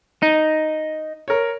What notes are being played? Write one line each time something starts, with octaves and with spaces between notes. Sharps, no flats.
D#4
A#4 C#5